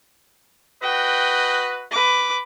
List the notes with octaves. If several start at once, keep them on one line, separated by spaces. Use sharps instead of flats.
F#4 B4 D#5 G5
B4 D6